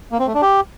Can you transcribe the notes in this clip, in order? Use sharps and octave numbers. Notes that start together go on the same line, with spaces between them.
A#3
C4
A3
D4
G4